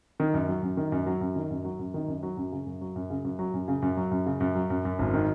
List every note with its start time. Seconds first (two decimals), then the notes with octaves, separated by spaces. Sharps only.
0.20 D#3
0.34 F#2
0.48 F#3
0.62 F#2
0.77 D#3
0.92 F#2
1.06 F#3
1.21 F#2
1.36 D#3
1.51 F#2
1.65 F#3
1.79 F#2
1.94 D#3
2.08 F#2
2.23 F#3
2.37 F#2
2.52 C#3
2.66 F#2
2.81 F#3
2.96 F#2
3.10 C#3
3.24 F#2
3.39 F#3
3.54 F#2
3.68 C#3
3.82 F#2
3.97 F#3
4.11 F#2
4.26 C#3
4.40 F#2
4.55 F#3
4.70 F#2
4.85 F#2
4.99 G#1
5.14 D#3